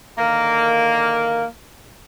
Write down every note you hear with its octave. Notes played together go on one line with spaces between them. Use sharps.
D3 D#3 A#3